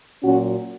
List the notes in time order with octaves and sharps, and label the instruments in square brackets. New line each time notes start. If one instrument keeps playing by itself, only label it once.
[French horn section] A#2 F#3 C#4 F#4